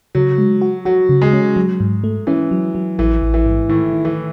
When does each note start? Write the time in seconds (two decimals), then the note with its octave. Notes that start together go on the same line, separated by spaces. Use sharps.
0.15 C#3 F#3
0.38 G#3
0.61 F#4
0.85 F#3 F#4
1.09 C#3
1.22 G#3
1.33 C#4
1.56 F#3
1.80 G#2
2.04 A3
2.27 E3 C#4
2.51 F#3
2.75 F#3
2.99 A1 E3
3.22 A1
3.34 E3
3.46 G#2
3.69 A2 D#3
3.93 D#3
4.05 E3